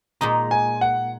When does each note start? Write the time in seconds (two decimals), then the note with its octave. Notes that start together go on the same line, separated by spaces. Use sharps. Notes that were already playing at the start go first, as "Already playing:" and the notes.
0.21 A#2 G#3 D#4 A#5
0.51 G#5
0.81 F#5